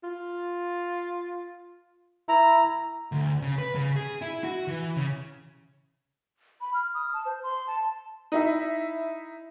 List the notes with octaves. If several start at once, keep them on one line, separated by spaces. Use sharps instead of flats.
F4
E4 A#5
D2
C#3
B4
C#3
G#4
E4
F#4
E3
C#3
B5
F6
D#6
A5
C5
C6
A5
D#4 E4 E5